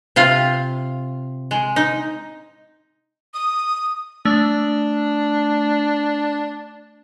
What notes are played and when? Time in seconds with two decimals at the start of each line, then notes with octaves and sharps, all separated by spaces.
0.16 C3 F4 F5
1.51 G#3
1.76 D#4
3.34 D#6
4.25 A3 D4